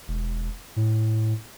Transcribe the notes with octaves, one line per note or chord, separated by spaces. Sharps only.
E1
A2